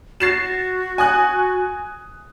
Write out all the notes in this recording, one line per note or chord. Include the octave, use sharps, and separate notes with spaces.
F#4 A6 C7 E7
G#5 D#6 F#6